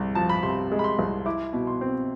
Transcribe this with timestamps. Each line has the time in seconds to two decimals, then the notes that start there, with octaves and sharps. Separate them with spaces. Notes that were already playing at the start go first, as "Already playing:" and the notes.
Already playing: C2 G#3
0.15 F3 A5
0.29 B5
0.43 C3 C6
0.72 G#3
0.79 B5
0.84 C6
0.99 C2
1.26 E4 D6
1.53 B2
1.67 C6
1.81 C4